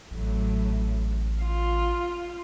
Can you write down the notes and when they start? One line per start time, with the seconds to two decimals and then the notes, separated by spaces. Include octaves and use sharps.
0.11 A1 A2 F#3
1.41 F4